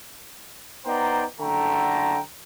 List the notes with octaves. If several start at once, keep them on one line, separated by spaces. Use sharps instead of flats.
B3 D#4 C5 D5 G5 A#5
F#1 D3 A3 G5 A#5